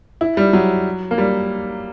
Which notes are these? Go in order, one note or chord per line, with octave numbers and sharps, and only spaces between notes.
E4
G3
F#3
A#3
G3